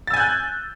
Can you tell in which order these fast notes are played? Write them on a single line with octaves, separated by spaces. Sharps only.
A6 E6 G#5 G6 F#6